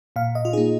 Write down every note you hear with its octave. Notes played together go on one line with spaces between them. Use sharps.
A#2 F5
D#5
F4
A#3 D#4 G#4